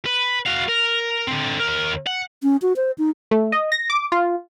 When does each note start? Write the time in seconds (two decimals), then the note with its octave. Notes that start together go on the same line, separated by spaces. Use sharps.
0.05 B4
0.46 F#4 F5
0.68 A#4
1.27 D3 C4
1.60 D#2 A#4
2.07 F#5
2.43 C#4
2.62 F#4
2.76 C5
2.98 D#4
3.31 A3
3.52 D#5
3.72 A#6
3.90 D6
4.12 F4